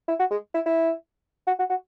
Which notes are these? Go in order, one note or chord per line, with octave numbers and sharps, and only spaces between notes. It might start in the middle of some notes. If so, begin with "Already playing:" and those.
E4
F#4
G#3
E4
E4
F#4
F#4
F#4